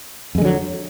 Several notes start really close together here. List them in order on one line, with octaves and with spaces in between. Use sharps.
F2 G#3 D3 F#3